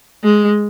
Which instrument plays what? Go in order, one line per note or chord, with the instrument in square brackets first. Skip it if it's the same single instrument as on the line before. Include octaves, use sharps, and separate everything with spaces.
[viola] G#3